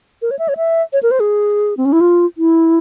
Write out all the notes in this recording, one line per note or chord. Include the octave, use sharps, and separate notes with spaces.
A#4
C#5
E5
C#5
E5
C#5
A#4
C5
G#4
C4
C#4
E4
F4
E4